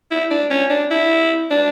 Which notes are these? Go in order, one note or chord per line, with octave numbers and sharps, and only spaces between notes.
E4
D4
C#4
D4
E4
D4